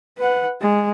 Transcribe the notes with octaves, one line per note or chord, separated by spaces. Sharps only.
B4 F#5
G#3